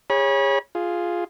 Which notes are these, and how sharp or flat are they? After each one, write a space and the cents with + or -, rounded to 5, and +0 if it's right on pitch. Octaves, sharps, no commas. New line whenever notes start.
G#4 -35 C#5 -10 B5 -35
F4 +0 G#4 +0